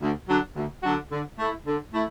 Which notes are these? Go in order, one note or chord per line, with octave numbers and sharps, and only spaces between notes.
D2
D3 F#3 D4 F#4
D2
D3 F#3 D4 F#4
D3
A3 E4
D3
A3 E4